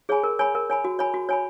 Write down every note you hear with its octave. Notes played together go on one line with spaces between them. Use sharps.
G#4 C#5 G#5 B5
A#4
C#5 G#5 B5
A#4
C#5 G#5 B5
F#4
C#5 G#5 B5
F#4
C#5 G#5 B5